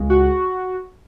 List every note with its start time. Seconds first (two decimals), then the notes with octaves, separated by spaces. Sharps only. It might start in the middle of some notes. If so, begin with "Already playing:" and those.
Already playing: C#2 C#3 G#3
0.10 F#4